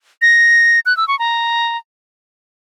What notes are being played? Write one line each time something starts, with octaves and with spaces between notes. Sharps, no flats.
A#6
F#6
E6
C#6
A#5